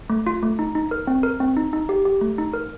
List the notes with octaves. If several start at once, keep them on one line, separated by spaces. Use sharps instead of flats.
A3
F4
A3
D#4
D#4
A#4
C4
A#4
C4
D#4
D#4
G4
G4
A3
D#4
A#4